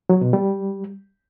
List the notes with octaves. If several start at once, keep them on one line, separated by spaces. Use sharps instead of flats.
F#3
B2
G3